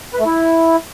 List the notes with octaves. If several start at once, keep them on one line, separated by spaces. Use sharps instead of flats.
B4
A3
E4